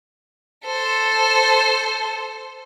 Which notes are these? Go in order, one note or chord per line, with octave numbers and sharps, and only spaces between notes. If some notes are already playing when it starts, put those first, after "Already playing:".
A4 C5